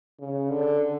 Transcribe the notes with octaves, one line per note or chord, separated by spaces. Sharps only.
C#3
D3